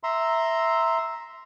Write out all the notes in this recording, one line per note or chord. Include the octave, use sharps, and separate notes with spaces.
E5 A#5 C6